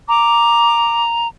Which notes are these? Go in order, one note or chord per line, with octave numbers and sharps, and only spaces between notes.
A#5 D6